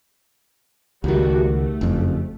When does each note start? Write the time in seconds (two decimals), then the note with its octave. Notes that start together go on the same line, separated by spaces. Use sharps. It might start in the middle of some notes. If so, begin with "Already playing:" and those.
1.04 C#2 D#3 G3 A3 F#4
1.48 A3
1.81 F#1 F2